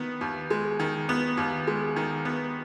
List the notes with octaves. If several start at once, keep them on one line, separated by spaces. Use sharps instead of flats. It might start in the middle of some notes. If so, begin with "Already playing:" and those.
Already playing: D#3 B3
D#2
G#3
D#3
B3
D#2
G#3
D#3
B3